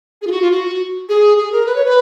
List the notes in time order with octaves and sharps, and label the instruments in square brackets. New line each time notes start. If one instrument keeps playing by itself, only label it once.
[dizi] G#4
F4
F#4
F4
F#4
G#4
G#4
A#4
B4
C#5
B4